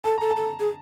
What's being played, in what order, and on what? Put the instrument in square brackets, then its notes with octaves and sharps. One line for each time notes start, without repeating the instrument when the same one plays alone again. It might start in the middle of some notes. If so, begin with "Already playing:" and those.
[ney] A4 [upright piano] A5
[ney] A4 [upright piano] A#5
[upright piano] A5
[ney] A4
G#4